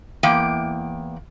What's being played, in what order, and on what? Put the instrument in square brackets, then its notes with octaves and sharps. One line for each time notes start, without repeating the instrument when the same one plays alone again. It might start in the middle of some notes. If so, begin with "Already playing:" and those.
[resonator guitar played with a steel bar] E2 A#3 G5